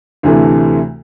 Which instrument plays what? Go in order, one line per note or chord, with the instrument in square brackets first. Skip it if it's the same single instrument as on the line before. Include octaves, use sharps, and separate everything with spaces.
[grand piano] D2 C3 E3 A3